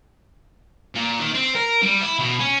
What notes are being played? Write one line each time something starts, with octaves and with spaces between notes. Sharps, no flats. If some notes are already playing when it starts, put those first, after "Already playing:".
A#2
D#3
C4
A#4
G3
E4
B2
C#4